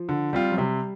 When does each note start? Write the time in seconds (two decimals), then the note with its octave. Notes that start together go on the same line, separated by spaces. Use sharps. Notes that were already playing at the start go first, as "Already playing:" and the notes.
Already playing: F3
0.09 D3
0.33 G3 C4 F4
0.52 F#3
0.57 C3 G3